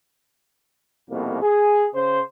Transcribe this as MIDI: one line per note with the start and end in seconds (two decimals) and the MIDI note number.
1.10 1.37 36
1.10 1.37 41
1.10 1.37 47
1.10 1.37 58
1.42 1.86 68
1.94 2.20 49
1.94 2.20 72